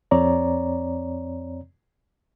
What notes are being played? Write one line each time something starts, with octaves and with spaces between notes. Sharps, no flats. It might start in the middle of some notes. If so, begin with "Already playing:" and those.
F2 C4 C#5 D5 A#5